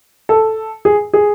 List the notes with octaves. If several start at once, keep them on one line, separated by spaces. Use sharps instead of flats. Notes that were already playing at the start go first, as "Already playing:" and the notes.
A4
G#4
G#4